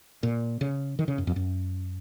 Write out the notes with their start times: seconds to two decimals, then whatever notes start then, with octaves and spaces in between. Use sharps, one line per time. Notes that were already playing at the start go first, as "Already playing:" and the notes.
0.23 A#2
0.61 C#3
0.99 D#3
1.08 C#3
1.18 F#2
1.27 F2
1.36 F#2